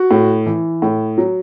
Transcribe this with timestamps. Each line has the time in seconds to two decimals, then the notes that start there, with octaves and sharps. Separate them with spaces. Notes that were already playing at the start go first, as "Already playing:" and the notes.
Already playing: F#4
0.11 A2
0.46 E3
0.82 A2
1.18 F#3